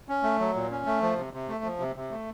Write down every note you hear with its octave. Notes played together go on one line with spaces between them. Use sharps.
C#4
A3
F#3
A#2
C#4
A3
F3
C3
C3
A3
F3
C3
C3
A3